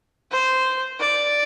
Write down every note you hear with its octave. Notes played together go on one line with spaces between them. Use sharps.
C5
D5